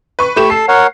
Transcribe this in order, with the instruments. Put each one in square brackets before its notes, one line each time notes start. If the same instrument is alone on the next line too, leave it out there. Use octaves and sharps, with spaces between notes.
[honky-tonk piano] B4 C#6
[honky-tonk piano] A3 G4 E7 [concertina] B5 C#6
[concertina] A4 A5 [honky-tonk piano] C7
[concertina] A#4 C#5 F#5